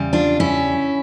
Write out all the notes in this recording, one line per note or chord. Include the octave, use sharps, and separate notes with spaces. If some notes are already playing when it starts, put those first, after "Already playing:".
Already playing: E2 C#3 G3
D4 F4
C#4 E4